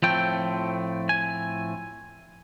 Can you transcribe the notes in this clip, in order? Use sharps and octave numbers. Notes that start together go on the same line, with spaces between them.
A2 F3 A3 C4 G5
G#5